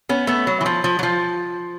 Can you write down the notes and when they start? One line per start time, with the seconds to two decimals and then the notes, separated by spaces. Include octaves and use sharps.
0.09 B3 C#4
0.27 A3 B3
0.47 F#3
0.61 E3
0.66 F3
0.84 F3
0.99 F#3
1.03 F3